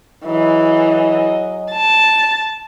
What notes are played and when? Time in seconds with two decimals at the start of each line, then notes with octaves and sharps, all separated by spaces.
0.25 E3 F#3 G#4 D#5
1.71 A5